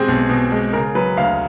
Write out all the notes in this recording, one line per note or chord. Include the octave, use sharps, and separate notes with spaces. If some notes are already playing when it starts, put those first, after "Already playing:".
Already playing: B2 G#3 C4 G4 G#4
B1
B2
G#3
C#3 A#4
F#3 B4
D2 F5